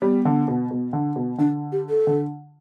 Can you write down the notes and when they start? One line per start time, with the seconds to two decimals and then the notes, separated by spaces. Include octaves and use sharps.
0.02 G3 B3
0.25 D3
0.48 B2
0.71 B2
0.93 D3
1.16 B2
1.38 D3 D4
1.72 G4
1.90 A4
2.07 D3